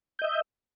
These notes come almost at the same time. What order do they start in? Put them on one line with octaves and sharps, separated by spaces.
G6 D#5 E5